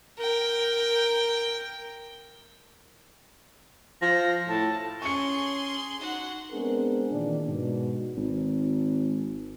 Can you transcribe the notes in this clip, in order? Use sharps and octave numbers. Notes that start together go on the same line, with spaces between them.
A#4 G5
F3 A#6
A2 A5
C#4 G#4 C6 C#6 C#7
D#4 F#4 F#5
G#3 B3 C4 D4 G#4 A#4
A#2 D#3 E3 D4
G#2 B2
G#1